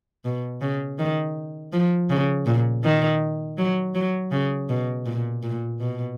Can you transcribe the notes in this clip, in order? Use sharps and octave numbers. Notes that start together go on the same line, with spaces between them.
B2
C#3
D#3
F3
C#3
A#2
D#3
F#3
F#3
C#3
B2
A#2
A#2
B2